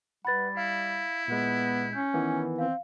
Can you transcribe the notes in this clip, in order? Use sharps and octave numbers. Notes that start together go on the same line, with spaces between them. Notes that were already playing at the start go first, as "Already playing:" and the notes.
G3 B4 F#5 B5 A6
E4 F5
A#2 G#3 B3
C#4 G6
D#3 E3 B3
C4 F5